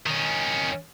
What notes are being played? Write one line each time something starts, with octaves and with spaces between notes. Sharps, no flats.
D#3 C#4